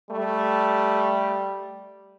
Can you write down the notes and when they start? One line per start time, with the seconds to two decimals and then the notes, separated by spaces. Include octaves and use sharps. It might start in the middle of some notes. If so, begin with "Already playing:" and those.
0.11 G3 A3